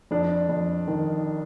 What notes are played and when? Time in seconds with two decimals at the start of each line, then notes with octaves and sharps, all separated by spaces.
0.11 F2 D4
0.49 F2
0.88 D#3